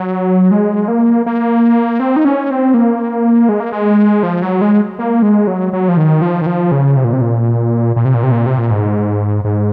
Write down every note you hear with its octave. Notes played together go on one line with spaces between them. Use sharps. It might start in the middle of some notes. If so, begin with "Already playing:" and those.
Already playing: F#3
G#3
A#3
A#3
C4
D#4
C#4
C4
A#3
G#3
A#3
G#3
F3
F#3
G#3
A#3
G#3
F#3
F#3
F3
D#3
F3
D#3
F3
C#3
C3
A#2
C3
A#2
A#2
C3
A#2
C3
A#2
C3
A#2
G#2
G#2